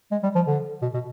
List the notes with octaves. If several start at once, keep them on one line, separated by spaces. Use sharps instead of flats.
G#3
G3
F3
D3
B2
B2